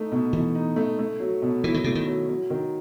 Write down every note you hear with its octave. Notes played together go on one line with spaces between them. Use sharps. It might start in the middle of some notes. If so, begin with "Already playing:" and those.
Already playing: A3 D#4
B2
B2 E3
D#4
A3
A3
F#3
B2
E3 E4
D#3
C3 A3
D#3
F#3
F#3
D#3